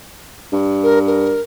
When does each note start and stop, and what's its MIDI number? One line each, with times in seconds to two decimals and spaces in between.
0.52 1.38 43
0.83 0.99 70
1.07 1.41 70